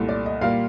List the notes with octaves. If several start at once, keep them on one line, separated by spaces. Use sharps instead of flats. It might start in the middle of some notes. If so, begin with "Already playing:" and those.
Already playing: C2 A#2 A3
D5
D#5
A#2 G3 A#3 F5